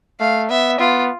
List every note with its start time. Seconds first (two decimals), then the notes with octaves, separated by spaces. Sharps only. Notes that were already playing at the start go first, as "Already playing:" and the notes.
0.20 A3 F5
0.50 B3 E5
0.79 B3 F4